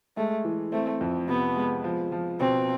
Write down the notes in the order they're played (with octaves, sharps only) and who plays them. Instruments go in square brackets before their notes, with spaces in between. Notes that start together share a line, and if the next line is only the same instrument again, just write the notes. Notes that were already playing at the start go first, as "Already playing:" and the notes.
[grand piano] G#3 [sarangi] A3
[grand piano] E3
[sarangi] A3 [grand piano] C4
[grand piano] F2
[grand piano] C3 [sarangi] B3
[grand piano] G#3
F3
F3
[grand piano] B2 [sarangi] C4